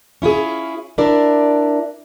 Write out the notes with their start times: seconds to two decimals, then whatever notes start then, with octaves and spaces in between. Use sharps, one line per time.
0.22 C#4 E4 F4 G#4
0.98 D4 E4 A#4 D5